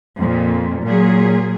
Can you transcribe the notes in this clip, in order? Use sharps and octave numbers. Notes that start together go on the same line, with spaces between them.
F2 A#2
A#2 F#3 G#4